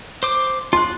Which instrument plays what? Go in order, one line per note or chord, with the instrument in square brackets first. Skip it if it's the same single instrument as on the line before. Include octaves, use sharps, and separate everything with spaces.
[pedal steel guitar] C5 D6
[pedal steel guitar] F4 F#6 [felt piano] C6